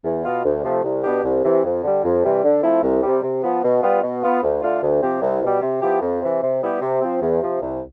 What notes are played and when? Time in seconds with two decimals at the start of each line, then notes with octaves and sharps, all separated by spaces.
0.04 E2
0.24 B2 B3 F4
0.45 D2
0.64 C3 F3 A3
0.83 C2
1.03 B2 B3 D4 G4
1.24 C2
1.43 C3 E3
1.64 F2
1.83 D3 G3
2.04 F2
2.23 C3 E3 G3
2.44 D3
2.63 F3 A3 C4 E4
2.83 C2
3.02 C3 G3
3.23 C3
3.43 F3 B3
3.63 B2
3.83 G3 B3 F4
4.03 B2
4.23 B3 F4
4.42 D2
4.62 D3 A3 D4 F4
4.82 D2
5.02 C3 F3 C4 G4
5.22 C2
5.42 B2 G3
5.62 C3
5.82 F3 B3 E4 G4
6.01 F2
6.22 C3 E3
6.42 C3
6.61 G3 B3 E4 G4
6.81 C3
7.01 F3 C4
7.22 E2
7.41 C3 F3
7.61 C2